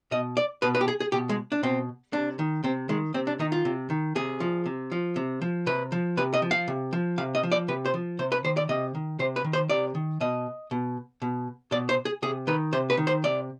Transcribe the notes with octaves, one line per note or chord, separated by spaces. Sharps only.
B2 D#5
D5
B2 B4
B4
G4
G#4
G#4
B2 G4
G#3
D4
B2 C4
C3 D4
D#3
C3 C4
D#3 G#3
C3 C4
D4
D#3 D#4
F4
C3
D#3
C3 G#4
F3
C3
F3
C3
F3
C3 B4
F3
C3 B4
D#5
F3
F5
C3
F3
C3 F5
D#5
F3
D5
C3 B4
C5
F3
C3 C5
B4
D#3 C5
D5
C3 D#5
D#3
C3 C5
B4
D#3
C5
C3 D5
D#3
B2 D#5
B2
B2
B2 D5
C5
G#4
C3 G#4
D#3 B4
C3 C5
B4
D#3
C5
C3 D5